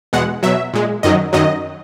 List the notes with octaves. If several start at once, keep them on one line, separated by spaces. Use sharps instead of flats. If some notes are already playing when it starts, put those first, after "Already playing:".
E2 B2 G#3 F#5
B2 F#3 E5
A#2 G#3
F#2 D#3 F#3 D#5
F#2 D#3 F#3 D#5